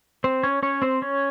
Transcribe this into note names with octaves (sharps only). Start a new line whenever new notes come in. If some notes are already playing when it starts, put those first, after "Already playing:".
C4 C5
C#4 C#5
C#4 C#5
C4 C5
C#4 C#5